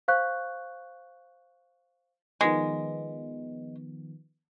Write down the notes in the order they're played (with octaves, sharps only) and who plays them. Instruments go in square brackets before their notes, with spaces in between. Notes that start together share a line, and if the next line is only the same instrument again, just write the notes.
[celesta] C5 F5 C#6 F#6 G6
[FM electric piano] D#3 F3 B3 [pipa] G#3